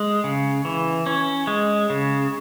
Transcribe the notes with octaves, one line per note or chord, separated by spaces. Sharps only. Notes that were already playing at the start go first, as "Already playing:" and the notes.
Already playing: G#3
C#3
E3
C#4
G#3
C#3